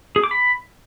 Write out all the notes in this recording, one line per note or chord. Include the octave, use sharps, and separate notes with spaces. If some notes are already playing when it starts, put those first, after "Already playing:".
G#4
D6
B5